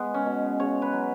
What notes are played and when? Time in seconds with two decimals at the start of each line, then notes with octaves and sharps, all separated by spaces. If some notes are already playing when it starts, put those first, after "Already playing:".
Already playing: G#3 B3
0.14 C#4
0.26 B2
0.60 C#3 C#5
0.82 B4
0.93 F#3